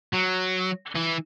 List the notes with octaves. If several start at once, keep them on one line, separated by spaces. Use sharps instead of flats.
F#3
E3